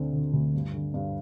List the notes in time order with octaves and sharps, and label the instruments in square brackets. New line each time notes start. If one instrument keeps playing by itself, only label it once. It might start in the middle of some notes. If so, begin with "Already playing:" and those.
Already playing: [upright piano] D2 D3 C4
D3
D2
G2
D3
G2